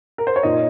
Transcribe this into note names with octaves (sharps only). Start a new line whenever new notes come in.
A#4
C5
C#5
A#2 D#4 D#5